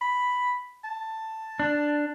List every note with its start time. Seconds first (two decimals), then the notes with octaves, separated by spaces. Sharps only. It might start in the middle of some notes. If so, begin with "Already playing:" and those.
0.01 B5
0.84 A5
1.60 D4